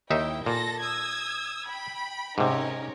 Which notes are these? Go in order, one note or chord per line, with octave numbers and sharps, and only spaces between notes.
D#2 D#4 E4 E5 G5
A#2 A4 A#6
D#6 E6 G#6
G5 B5
G#2 C3 C#4 D#4 A#4